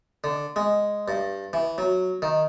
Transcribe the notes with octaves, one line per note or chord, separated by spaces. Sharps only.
D3
G#3
G2
E3
F#3
D#3